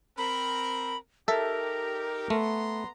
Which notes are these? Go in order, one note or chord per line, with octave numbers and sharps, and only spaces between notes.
C4 A#4 B5
D#4 G4 A4 A#4 E5
A3 B3 A#5 C6